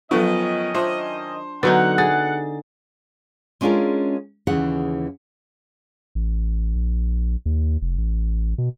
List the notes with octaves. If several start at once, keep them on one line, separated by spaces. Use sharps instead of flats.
D#3 F3 F#3 B3 C#4 A4 D#5 C#6
D4 F4 C5 E5
D3 F#3 B3 D#4 A4 B4 F#5
G#4 A6
G#3 C#4 D4 F4 G#4 A#4
D#2 C#3 E3 G#4 F#5
A1
A#1
D#2
F1
A1
B2